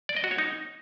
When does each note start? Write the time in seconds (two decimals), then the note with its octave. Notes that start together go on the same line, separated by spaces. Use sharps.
0.09 D5
0.16 D#5
0.24 F#4
0.31 C#5
0.38 D#4